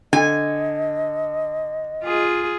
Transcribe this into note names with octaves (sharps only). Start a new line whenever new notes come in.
D3 D#5 G#5
F4 G#4